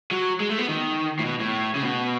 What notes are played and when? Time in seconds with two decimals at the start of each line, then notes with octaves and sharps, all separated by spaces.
0.11 F#3
0.40 G#3
0.50 A3
0.59 B3
0.68 D#3
1.19 A2
1.25 B2
1.40 A2
1.75 C#3
1.83 B2